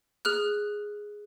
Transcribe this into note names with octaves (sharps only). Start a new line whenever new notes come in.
G#4 F6 F#6